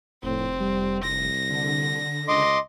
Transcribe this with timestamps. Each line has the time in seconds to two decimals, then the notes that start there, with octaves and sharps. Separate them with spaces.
0.23 F1 A2 C4
0.60 G3
1.03 C2 A#6
1.50 D3
2.28 C#2 D#5 C6 D6